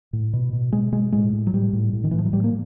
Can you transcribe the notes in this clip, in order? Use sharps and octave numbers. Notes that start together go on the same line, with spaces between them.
A2
B2
B2
B2 G#3
B2 G#3
A2 G#3
A2
F#3
A2 G3
A2
A2
D#3
A2 E3
F3
F#3
A2 G3
A#3